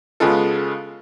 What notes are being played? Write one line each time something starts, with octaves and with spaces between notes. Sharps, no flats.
C#3 G#3 B3 F4 A4